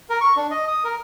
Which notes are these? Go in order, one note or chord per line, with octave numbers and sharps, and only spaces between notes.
A#4
C#6
D4
D#5
D#6
A#4